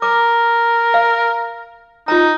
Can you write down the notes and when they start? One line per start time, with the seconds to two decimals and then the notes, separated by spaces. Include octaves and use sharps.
0.02 A#4 D6
0.94 F5
2.08 D#4 F4 A#5